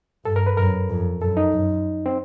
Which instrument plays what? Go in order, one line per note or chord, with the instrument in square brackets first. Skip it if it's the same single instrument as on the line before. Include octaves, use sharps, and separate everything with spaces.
[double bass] G2 [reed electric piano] A4
[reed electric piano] A#4
B4
[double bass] F#2 [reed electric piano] A#4
[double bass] F2
[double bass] F#2 [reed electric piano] A4
[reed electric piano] D#4
[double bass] F#2
[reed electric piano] C4